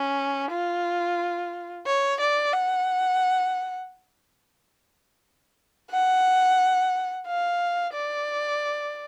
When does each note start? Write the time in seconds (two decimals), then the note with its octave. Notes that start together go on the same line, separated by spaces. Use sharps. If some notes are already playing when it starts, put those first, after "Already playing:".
Already playing: C#4
0.51 F4
1.86 C#5
2.20 D5
2.54 F#5
5.91 F#5
7.26 F5
7.93 D5